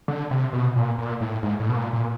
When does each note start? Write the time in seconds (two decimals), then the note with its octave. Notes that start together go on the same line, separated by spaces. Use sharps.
0.08 D3
0.31 C3
0.53 B2
0.76 A#2
0.98 A#2
1.21 A2
1.43 G#2
1.60 A2
1.69 B2
1.76 A#2
1.93 A#2